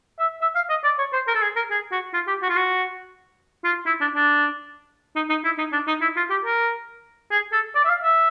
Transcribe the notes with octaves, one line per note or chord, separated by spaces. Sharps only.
E5
E5
F5
D#5
D5
C#5
C5
A#4
A4
G#4
A#4
G#4
F#4
F4
G4
F#4
F4
F#4
F4
E4
D4
D4
D#4
D#4
E4
D#4
D4
D#4
E4
F4
G4
A#4
G#4
A4
D5
E5
F5
E5